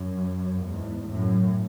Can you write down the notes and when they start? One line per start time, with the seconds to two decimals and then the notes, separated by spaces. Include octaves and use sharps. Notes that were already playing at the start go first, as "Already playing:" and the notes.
Already playing: F#2
0.64 E2 G#2
1.07 F#2 A2